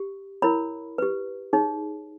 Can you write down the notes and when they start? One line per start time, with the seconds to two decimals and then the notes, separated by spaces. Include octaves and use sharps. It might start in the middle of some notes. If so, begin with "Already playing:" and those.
Already playing: G4
0.42 E4 A#4 C#5 B5
0.98 G4 B4
1.53 D#4 G#4 C#5